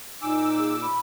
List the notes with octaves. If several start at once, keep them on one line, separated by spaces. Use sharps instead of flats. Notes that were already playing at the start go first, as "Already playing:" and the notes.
A#2 D#4 G#5 D6 E6
G#4
B5